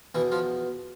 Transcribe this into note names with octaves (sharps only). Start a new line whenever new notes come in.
E2 B2 E3 E4
F3 F4